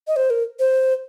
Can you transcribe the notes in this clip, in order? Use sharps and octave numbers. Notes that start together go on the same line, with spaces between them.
D#5
C5
A#4
C5